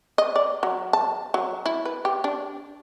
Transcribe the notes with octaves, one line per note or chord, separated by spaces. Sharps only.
D#5
D5
F#3
A5
F#3
E4
B4
G4
D4